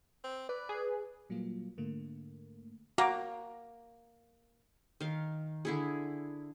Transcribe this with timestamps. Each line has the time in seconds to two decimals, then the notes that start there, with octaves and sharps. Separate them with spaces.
0.24 C4
0.49 B4 D5
0.69 G#4
1.29 A#2 F#3 G3 A#3 F4
1.78 G#2 D3 A3 A#3
2.98 A#3 F#4 A#5 D6
5.01 D#3 F5
5.65 D3 E4 G#4